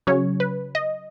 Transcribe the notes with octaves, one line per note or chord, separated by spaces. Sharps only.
C#3 F#3 C#4 C#5
B4
D#5